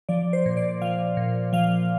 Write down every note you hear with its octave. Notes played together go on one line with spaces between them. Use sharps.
F3 D5
C5
A#2
D5
F3 F5
A#2
F3 F5